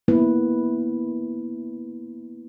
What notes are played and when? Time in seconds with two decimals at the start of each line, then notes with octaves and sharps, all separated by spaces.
0.08 A#3 B3 E4 B4